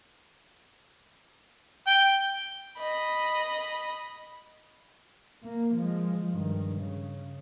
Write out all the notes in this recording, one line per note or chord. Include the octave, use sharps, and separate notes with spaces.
G5
D#5 B5
A#3
F3 G#3
G2 D#3
C#3